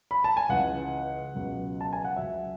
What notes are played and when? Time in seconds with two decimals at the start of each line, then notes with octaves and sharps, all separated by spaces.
0.11 B5
0.24 A5
0.37 G#5
0.49 C#2 C#3 E3 F#5
1.34 C#2 B2 F#3
1.81 A5
1.93 G#5
2.05 F#5
2.16 C#2 C#3 F#3 E5